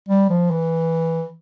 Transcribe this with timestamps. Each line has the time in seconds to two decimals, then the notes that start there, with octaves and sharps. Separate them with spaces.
0.08 G3
0.29 F3
0.51 E3